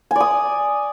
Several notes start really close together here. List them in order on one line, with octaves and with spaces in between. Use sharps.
G#5 D5 D#6